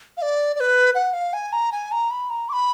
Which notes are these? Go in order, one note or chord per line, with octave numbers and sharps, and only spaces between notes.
F5
D5
D5
B4
F#5
F5
G#5
A#5
G#5
A#5
B5
A#5
D6
B5